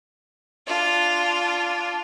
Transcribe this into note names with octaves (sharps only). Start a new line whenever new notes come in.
D4 F4